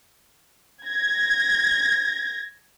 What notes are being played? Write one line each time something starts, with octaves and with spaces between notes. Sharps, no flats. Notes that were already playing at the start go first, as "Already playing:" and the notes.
G#6 A#6